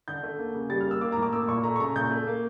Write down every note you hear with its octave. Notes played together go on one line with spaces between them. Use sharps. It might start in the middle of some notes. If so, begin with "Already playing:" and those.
D3 G6
A3
A#3
C#3
G3 A6
F6
A#3
E6
A#3 D6
A#5
A2
D6
A#3 E6
A#2 C#6
A3 A#5
C#6
C#3 A#5
A#2 G6
A3
A#3